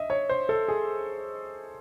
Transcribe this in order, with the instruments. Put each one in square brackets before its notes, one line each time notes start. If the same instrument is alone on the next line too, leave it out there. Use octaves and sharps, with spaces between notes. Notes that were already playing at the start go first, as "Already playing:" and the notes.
Already playing: [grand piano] D#5 E5
C#5
C5
A4
G#4